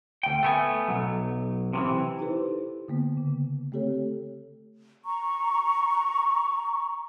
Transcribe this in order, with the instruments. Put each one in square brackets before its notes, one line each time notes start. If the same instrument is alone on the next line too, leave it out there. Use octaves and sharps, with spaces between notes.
[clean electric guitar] D2 G5
A3 B3 G#5
B1 F#3
C3 D#3 E3
[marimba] D#4 E4 G4 A4 B4 C5
D3 A#3 B3
C#3
A3 C4 G4 A4 C#5
[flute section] A#5 C#6